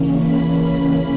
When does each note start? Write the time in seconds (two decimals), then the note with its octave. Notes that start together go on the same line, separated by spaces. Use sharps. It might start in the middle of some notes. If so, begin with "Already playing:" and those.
Already playing: C#3 E3 A#3 C#4
0.19 B5